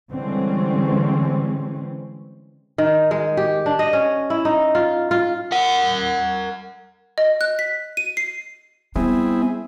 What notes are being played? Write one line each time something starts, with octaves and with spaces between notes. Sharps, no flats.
D3 E3 G3 G#3 C4 C#4
D#3
G#3
G4
D4
D#5
C#4
E4
D#4
F4
F4
A#4 F#5
D#5
F#6
B6
D#7
C7
G3 B3 C4 E4 G#4